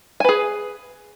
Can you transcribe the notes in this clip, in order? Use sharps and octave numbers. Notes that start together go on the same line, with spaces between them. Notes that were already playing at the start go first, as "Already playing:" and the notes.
G#4 B4 G#5